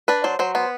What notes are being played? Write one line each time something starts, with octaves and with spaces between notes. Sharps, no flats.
D4 B4
F#3 C5
F#3 C5
B3 C5